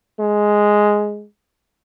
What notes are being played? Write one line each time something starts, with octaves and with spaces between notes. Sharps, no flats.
G#3